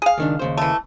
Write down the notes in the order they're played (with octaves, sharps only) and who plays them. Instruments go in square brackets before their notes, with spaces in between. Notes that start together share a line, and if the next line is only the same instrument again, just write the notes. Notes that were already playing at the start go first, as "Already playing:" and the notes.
[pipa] G#4 F5
[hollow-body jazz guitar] C#2 D#3 D4
D#2 C#3 C5
[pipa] E3 A3